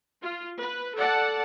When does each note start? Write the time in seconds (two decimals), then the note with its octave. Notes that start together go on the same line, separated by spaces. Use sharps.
0.21 F4
0.59 B4
0.96 A4 D5 F#5 A5